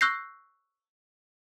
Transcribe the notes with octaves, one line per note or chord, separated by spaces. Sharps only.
C#6 E6 F#6 G6 A#6 C7